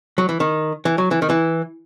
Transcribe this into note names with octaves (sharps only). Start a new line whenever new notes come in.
F#3
E3
D#3
E3
F#3
E3
D#3
E3